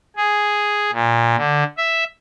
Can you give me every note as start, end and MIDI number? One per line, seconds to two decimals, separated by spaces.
0.16 0.91 68
0.93 1.36 46
1.37 1.63 50
1.78 2.04 76